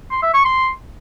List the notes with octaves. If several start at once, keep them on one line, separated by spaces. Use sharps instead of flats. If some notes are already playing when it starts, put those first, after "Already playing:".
C6
E5
C#6
C6